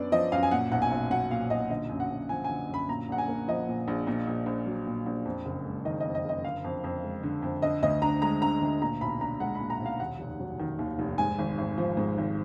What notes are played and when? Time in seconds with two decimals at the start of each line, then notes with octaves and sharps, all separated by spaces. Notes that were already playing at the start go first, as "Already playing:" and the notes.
Already playing: F#2 B3 D4 D5
0.12 F3 D#5
0.32 F#2 F5
0.43 G#5
0.51 A#2 F#5
0.72 B1 F#5
0.82 G#5
0.91 B1
1.11 F#3 F#5
1.31 A#2 F5
1.50 B1 D#5
1.70 D3 D#5
1.90 F#2
2.00 F#5
2.10 F#2
2.29 F3 G#5
2.44 D3 G#5
2.69 F#2
2.74 B5
2.89 A#2 A#5
3.08 A#1 F#5
3.18 G#5
3.28 A#3
3.48 F3 D#5
3.68 A#2
3.88 A#1
4.07 A#2
4.27 A#1
4.46 A#1
4.66 F#3
4.87 A#2
5.06 A#1
5.25 F2
5.46 F#1
5.65 G#3
5.85 D#3 D#5
6.00 F2 D#5
6.15 D#5
6.25 F#1 D#5
6.44 D3 F5
6.64 F2
6.84 F2
7.04 G#3
7.23 D3
7.42 F2
7.62 D3 D#5
7.82 D2 D#5
8.02 D4 A#5
8.22 G#3 A#5
8.42 D3 A#5
8.61 D2
8.82 A#2 A#5
9.01 B1 B5
9.21 D4 A#5
9.40 G#3 F#5
9.55 A#2 B5
9.70 A#5
9.80 B1
9.86 F5
10.00 D#2 F#5
10.19 F1
10.40 F#3
10.59 D#3
10.79 D#2
10.99 F1
11.18 G#2 G#5
11.38 G#1
11.58 G#1
11.78 F3
11.97 G#2
12.18 G#1